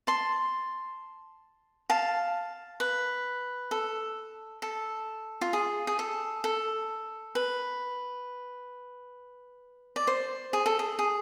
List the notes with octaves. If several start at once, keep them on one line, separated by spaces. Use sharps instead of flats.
A5 C6
F5 A5
B4
A4
A4
F4
G#4
G#4
A4
A4
B4
D5
C5
G#4
A4
G#4
G#4